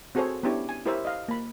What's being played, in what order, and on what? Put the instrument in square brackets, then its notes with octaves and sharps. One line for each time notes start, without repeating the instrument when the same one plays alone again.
[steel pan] C4 F#4 G#4 A4 C5 C#5
B3 C#4 D4 E4 G4 C#5
G#5
E4 G4 A#4 C5 C#5 E5
D#5 F5
A#3 B5